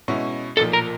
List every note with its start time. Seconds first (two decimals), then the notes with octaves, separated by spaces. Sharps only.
0.08 B2 G#3 C#4 E4
0.57 B1 A#2 F3 A#3 A4
0.73 A#4